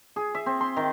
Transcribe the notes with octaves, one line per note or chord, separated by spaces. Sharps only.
G#4
E5
C4
C6
D#3